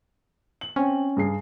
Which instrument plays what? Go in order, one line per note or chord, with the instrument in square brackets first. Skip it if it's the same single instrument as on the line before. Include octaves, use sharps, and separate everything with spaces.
[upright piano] F#7
[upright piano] C4 [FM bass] C#4
[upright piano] G2 G#4 C7